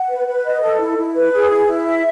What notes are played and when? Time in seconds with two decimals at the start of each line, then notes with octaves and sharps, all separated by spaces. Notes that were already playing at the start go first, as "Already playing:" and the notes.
Already playing: F#5
0.09 B4
0.27 B4
0.44 D#5
0.62 A4
0.79 E4
0.97 E4
1.14 B4
1.32 G#4
1.49 E4
1.67 E4
1.84 E5